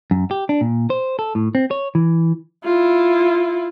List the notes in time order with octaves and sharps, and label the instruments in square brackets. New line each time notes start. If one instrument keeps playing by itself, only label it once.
[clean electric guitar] F#2
G4
D4
A#2
C5
A4
A2
C4
C#5
E3
[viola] E4 F4